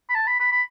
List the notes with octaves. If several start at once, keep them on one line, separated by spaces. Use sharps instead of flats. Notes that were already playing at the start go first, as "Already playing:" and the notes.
B5
A5
B5
B5
B5